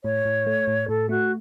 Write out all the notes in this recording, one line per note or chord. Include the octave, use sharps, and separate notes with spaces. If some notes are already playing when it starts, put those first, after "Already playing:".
A2 C#5
A2
A3
A2
A2 A4
A3 F#4